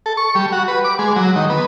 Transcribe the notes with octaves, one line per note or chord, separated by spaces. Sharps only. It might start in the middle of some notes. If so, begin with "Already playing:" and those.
A4
C#6
G3
F#4
B4
D6
G#3
F#3
D#3
B3